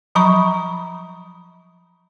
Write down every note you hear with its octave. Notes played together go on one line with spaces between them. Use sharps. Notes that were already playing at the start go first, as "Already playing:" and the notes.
F3 F#3 A#5 B5 C#6